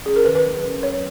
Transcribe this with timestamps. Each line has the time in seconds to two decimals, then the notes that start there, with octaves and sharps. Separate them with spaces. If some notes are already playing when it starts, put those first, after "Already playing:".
0.06 C#4 G#4
0.16 A#4
0.25 D#3 B4
0.35 B4
0.44 F#3
0.64 C#4
0.83 F#3 C#5